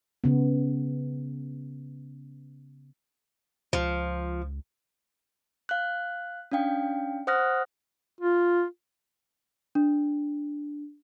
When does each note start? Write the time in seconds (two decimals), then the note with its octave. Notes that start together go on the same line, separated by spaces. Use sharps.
0.24 C#3 B3
3.73 C#2 F3
5.69 F5 F#6
6.52 C#4 D4 F5 G5
7.27 C5 F#5 D#6 F6 F#6 A#6
8.21 F4
9.75 D4